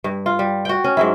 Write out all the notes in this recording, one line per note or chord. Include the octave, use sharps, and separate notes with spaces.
G2
F4
G3
F#4 G5
C#4
G#2 F#3 E4